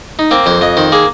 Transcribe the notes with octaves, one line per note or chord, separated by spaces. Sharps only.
D#4
A#3 C4
F2 C5
F2 D#5
D#3 C5
A#3 G#4